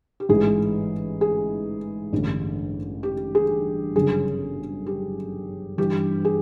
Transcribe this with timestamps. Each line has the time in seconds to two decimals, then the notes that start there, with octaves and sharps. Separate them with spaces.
0.20 G4
0.29 A1 G#2 E3 G#3 G#4
1.21 G#4
2.13 A1 G2 D3 G3
3.03 G4
3.35 G#4
3.95 G1 F#2 C#3 G#4
4.87 G4
5.78 G2 E3 G3 G4
6.25 G#4